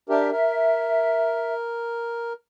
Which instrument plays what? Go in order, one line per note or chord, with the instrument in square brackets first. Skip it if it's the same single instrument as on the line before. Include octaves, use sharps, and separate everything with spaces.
[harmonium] D4 G4 A#4 [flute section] E5
[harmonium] A#4